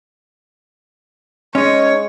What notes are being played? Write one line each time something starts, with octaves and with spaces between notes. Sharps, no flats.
G#3 C#4 D#4 C#5